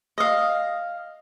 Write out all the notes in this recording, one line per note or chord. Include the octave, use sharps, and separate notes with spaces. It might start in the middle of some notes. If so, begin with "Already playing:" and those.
D#5 F5